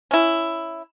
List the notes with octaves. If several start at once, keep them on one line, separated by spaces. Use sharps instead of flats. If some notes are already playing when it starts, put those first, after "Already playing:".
C#4 E4